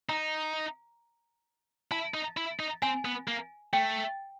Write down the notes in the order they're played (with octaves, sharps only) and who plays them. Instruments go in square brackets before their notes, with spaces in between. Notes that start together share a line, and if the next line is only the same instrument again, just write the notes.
[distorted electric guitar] D#4 [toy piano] A#5
[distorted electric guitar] E4 [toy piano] A5
[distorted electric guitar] D#4
E4
D#4
[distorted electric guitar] C4 [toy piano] G#5
[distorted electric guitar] B3
A#3
[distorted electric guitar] A3 [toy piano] G5